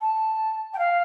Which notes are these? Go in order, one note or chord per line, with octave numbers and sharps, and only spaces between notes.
A5
G5
F5